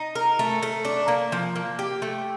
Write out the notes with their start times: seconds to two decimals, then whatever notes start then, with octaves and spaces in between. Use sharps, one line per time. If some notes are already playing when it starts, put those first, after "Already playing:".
Already playing: D#4
0.15 A#4
0.39 A3
0.62 A3
0.85 D4
1.08 A#3
1.32 F3
1.56 A#3
1.79 G4
2.02 A3